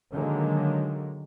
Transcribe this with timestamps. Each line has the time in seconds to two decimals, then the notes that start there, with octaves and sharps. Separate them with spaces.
0.12 D3 D#3 F#3 G#3 A#3